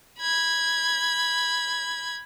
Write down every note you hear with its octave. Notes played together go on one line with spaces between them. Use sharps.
B5 G#6